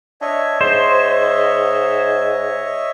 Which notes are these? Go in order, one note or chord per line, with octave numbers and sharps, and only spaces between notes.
D4 C#5 D#5 E5
G#2 C5